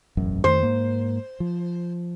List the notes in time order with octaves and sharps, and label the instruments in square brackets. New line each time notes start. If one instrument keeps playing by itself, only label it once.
[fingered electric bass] E1 A1 F#2
[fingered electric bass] F2 D#3 A3 [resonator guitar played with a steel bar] C5
[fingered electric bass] G#2 A#3
F3